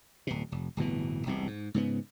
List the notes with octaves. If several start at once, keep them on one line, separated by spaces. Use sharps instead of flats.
D1 B2
F1
D1 G1 B2 E3
E1 C2 B2
G#2
G#2 C#3 B3